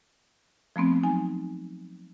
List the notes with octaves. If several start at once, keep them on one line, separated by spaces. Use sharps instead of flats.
F3 A3 B3 C4
F#3 D#4 G#5